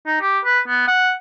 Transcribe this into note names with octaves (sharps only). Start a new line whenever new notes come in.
D#4
G4
B4
B3
F#5